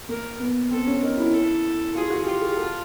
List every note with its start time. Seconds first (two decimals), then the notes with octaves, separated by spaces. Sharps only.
0.09 A#3 A#4
0.40 B3
0.71 C4 A4
0.87 C#4
1.02 D#4 A#4
1.17 E4
1.33 A4
1.95 F4 G#4
2.10 F#4
2.25 F4 G4
2.41 G#4
2.56 A4